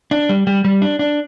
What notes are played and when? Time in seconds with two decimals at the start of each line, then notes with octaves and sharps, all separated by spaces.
0.11 D4
0.29 G3
0.47 G3
0.65 G3
0.82 D4
0.99 D4